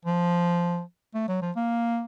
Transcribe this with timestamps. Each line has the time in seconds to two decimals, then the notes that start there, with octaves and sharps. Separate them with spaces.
0.05 F3
1.14 A3
1.28 F#3
1.42 F3
1.56 A#3